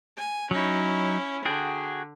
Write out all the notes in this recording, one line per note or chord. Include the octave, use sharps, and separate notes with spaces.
G#5
F#3 C#4 D#4 E4
D3 F#4 G#4 G5